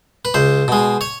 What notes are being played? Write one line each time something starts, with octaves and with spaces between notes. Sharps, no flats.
B4
C#2 C5
B2 G#3
C#5